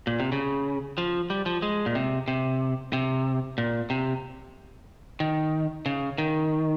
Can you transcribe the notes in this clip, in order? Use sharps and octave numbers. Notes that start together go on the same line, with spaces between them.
A#2
C3
C#3
F3
G3
F3
G#3
A#2
C3
C3
C3
A#2
C3
D#3
C#3
D#3